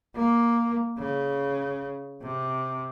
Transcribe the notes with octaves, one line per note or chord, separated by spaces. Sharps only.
A#3
C#3
C3